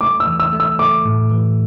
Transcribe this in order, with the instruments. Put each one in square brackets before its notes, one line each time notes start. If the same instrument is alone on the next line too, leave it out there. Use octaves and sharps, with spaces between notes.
[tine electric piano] A3 [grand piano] D6
[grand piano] E6
[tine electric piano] E3
[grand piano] E6
[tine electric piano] A3
[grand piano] E6
[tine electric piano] A3 [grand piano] D6
[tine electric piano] A2
E3